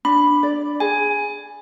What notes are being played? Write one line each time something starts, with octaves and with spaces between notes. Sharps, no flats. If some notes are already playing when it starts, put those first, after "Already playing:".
D4 B5
D5
G#4 G#5